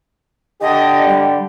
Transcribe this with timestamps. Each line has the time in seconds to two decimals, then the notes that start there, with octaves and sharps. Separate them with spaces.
0.62 D3 G4 D#5
1.08 G3